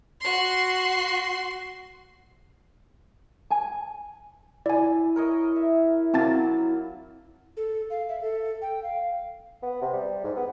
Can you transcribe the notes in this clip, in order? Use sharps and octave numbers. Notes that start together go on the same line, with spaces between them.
F#4 C6
G#5 A5
E4 D5 G#5
A#4 C#5 D#5
E5
F#3 A#3 C4 A5 A6
A4
F5
E5
A4
G5
F5
B3
C3
G3
G#2
B3